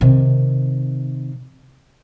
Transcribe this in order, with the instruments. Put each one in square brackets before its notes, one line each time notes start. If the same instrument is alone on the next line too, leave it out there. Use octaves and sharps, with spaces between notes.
[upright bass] C3 D#3